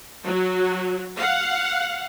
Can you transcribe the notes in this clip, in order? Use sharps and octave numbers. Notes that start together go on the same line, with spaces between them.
F#3
F5 F#5